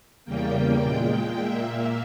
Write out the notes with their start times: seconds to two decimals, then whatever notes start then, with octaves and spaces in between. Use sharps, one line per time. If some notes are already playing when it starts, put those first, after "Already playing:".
0.25 E2 C#3 G3 A#3 G5
0.81 A#2 G#3
1.36 A#2 A#3 E5